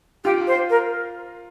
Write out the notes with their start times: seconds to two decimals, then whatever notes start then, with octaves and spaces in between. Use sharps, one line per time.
0.24 F4 G4
0.47 C5
0.70 A#4